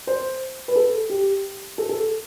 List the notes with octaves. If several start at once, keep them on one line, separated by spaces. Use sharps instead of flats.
C5
B4
A4
G4
A4
A4